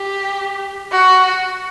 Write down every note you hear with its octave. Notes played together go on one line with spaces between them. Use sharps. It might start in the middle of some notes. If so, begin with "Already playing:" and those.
Already playing: G4
F#4